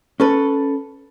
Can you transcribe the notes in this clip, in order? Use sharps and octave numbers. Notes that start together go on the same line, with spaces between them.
C#4 A4 B4